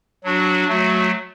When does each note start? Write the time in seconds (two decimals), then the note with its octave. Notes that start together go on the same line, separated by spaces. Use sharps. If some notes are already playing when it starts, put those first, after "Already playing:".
0.24 F#3 D4 F#4
0.68 F#3 A3 F#4